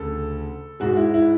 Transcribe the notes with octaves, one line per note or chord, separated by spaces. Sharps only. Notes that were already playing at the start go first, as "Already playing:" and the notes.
Already playing: D2 C#3 A4
G#2 G#3 F#4
E4
E4